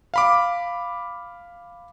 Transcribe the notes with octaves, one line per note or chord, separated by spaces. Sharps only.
F5 B5 D6